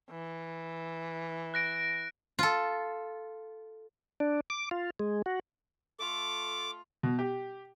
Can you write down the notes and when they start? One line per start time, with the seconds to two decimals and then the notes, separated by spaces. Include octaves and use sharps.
0.11 E3
1.54 F#6 A#6 D7
2.39 F4 A4
4.20 D4
4.50 D6
4.71 F4
5.00 G#3
5.26 F#4
6.00 A3 F4 A4 D6
7.03 B2
7.19 G4